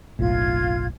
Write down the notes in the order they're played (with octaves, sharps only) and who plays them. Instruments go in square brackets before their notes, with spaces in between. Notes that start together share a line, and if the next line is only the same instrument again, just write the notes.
[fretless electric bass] F#1 B1 A2 [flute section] F4 G#6